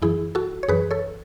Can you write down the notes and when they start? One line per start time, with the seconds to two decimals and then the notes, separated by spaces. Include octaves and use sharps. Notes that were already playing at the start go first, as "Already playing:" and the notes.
0.02 F#2 E3 E4 G#4
0.35 F#4 A4
0.63 C#5
0.69 F#2 E3 G#4 B4
0.91 A4 C#5